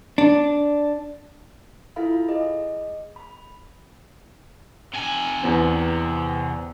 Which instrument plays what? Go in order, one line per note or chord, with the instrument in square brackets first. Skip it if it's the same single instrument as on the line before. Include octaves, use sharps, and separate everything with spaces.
[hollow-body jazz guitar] D4
[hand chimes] E4 F4 A4 E5 F5 B5
G#4 D#5
B5
[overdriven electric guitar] C3 G#5
[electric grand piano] E2 B3 C4